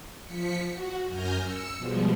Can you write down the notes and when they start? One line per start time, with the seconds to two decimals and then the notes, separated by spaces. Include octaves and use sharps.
0.24 F3 B6 C#7
0.70 F#4
1.07 F#2 G#5 F6 G6 A#6
1.40 E6 C#7
1.76 B2 F3 G3 G#3